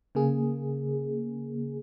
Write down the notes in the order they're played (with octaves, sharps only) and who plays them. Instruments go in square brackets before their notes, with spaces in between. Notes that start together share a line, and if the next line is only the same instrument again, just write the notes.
[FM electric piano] C#3 A#3 G#4